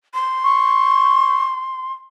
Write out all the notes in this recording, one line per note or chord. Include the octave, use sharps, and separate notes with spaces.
C6
C#6